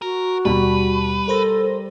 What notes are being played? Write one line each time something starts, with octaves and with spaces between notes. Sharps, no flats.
F#4 A#4
D#2 B2 G3 B4 A5 B5
A4 A#4 C5 A#6